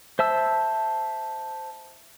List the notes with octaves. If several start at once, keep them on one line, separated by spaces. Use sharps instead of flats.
C5 E5 A5 E6